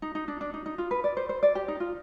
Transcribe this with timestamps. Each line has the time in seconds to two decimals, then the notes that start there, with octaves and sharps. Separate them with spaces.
0.02 D#4
0.15 D#4
0.28 D4
0.41 D4
0.54 D#4
0.66 D#4
0.78 F4
0.91 B4
1.04 D5
1.17 C5
1.29 C5
1.43 D5
1.55 G4
1.68 D#4
1.80 F4